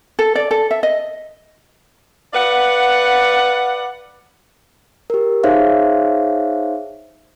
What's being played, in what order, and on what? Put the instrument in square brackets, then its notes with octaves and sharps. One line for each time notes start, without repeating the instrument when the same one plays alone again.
[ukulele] A4
D5
A4
E5
D#5
[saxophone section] B4 D5 F5 F#5
[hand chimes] G4 A#4
D#4 G#4 C5 C#5 E5 F5